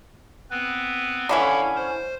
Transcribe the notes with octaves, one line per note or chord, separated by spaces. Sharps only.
B3 C4 B4
D3 E3 C#4 E4 A4 F5
C5